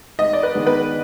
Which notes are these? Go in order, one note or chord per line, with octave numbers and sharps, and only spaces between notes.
G#2 D#5
D5
B4
D#3 G#3 B3
B4